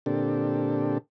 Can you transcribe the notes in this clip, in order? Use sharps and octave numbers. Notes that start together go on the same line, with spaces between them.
A#2 D3 C4 D4 G4 A4